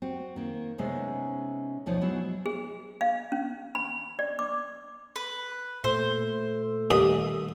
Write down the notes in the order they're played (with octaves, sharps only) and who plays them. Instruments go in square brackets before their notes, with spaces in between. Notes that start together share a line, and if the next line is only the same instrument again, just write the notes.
[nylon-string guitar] C4 F#4
D#3 A#3
C3 G#3 B3 C#4 D#4
D2 B2 F3 D#4 C#5
F#3 G#3 B3 E4 F#4
[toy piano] G#4
F5
C#4
B5
D5
D6
[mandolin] B4
[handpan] A#2 [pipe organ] A3 A4 [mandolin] C5
[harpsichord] D#2 A#2 [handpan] D#3 G3 [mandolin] D#6